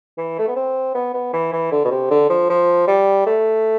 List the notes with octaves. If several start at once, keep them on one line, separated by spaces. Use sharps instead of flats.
E3
A3
B3
C4
B3
B3
E3
E3
D3
B2
C3
D3
F3
F3
G3
A3